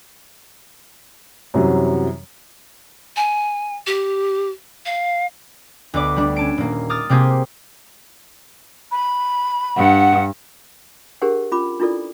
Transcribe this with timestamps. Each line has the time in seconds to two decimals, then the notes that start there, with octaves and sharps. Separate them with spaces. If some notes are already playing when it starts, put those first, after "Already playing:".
1.54 F#2 C3 E3 F#3 G3
3.16 G#5
3.87 G4
4.86 F5
5.94 D2 B3 D5 D6
6.16 G3 D4
6.36 C#4 A5 D7
6.58 D#1 A#3
6.90 D6 D#6 F6 A6
7.09 C3 A#3 C4 G4 G#4
8.92 B5
9.76 G2 F#5
11.22 D4 G4 G#4 A#4 C5 F#5
11.52 C#4 F4 B5 D6
11.80 D4 E4 F4 A4 D5